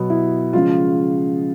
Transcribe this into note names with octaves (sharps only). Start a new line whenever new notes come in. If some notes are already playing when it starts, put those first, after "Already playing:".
Already playing: B2 F#3 B3
E4
C#3 F3 G#3 F4